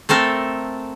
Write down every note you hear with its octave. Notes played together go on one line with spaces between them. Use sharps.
A3 C4 A4 A#4